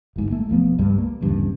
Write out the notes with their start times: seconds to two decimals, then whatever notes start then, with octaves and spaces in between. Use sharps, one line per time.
0.16 G1 G#2
0.31 A3 A#3
0.49 E1 F3 B3
0.78 C#2 G2 G3 G#3
0.98 A#3
1.21 D1 E2 G2 C#3